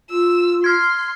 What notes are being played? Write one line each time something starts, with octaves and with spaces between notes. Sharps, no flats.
F4 E6
C6 F6 G#6